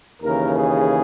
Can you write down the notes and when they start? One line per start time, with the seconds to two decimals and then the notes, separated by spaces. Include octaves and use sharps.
0.22 D#2 C#3 E3 A#4
0.57 G#4